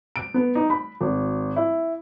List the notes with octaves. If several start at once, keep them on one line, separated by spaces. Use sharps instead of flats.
D7
B3
D#4
B5
G#1
E4